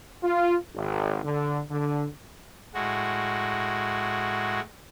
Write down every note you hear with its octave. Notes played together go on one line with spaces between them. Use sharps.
F4
G#1
D3
D3
A2 G#3 F#4